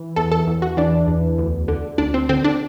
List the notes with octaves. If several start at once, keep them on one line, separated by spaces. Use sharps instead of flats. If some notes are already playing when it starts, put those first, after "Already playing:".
Already playing: E3
E2 A4
A4
E2
F#4
E3 D4
E2
D2
D3
D2 D4
C4
D3 C4
D4